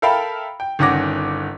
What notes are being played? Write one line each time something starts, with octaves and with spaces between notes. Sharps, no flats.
A4 A#4 E5 F5 G5 B5
G5
G1 D#3 C#4 F#5 D6 A#6